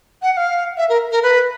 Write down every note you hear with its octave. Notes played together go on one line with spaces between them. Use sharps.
F#5
F#5
F5
E5
A#4
A#4
B4